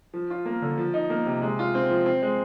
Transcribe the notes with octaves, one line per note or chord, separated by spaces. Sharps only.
F3
F4
A#3
D3
F3
D#4
A#3
C3
G#3
F4
C4
F3
C4
G#3